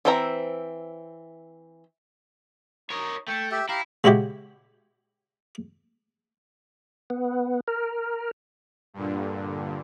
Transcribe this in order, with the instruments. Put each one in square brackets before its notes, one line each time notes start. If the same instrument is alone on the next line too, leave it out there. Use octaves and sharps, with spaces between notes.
[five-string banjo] E3 C4 C5 E5 A#5
[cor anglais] D#4 [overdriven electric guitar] A#4 C#5
[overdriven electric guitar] A3 A4 [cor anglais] G5
[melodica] G4 E5 [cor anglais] G5
[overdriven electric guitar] E4 [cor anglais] G4 [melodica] F5 A#5
[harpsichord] C#3 G#3 E4 F#4 G4
[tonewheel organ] B3
A#4
[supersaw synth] G2 A#2 D3